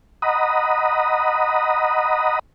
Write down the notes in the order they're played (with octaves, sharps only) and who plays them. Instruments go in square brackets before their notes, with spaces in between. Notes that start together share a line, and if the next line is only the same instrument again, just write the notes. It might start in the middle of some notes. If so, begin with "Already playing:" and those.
[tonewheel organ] D#5 F#5 A#5 B5 D#6